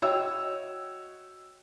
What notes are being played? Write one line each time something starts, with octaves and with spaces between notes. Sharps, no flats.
F#4 C#5 D#5 G5 E6